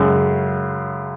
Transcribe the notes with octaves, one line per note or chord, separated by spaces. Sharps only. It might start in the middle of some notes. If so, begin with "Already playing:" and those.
Already playing: F#2 C#3 G#3